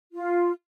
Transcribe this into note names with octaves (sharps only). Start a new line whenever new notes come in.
F4